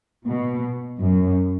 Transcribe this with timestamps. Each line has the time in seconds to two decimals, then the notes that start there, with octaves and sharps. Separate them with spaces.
0.27 B2
1.00 F#2